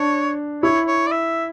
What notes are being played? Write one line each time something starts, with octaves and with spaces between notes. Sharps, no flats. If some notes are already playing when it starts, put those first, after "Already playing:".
Already playing: D4 C#5
E4 C#5
C#5
D5
E5